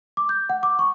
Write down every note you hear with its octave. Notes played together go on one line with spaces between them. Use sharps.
D6
G6
F#5
D6
C#6